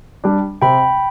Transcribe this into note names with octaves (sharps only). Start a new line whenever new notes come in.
G3 D4
C3 G5 B5